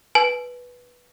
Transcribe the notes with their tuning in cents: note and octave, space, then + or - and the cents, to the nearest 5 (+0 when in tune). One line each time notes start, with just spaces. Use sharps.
B4 -5 G#5 +45